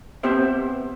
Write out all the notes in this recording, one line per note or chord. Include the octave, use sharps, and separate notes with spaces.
B3 C4 G4 C5 E5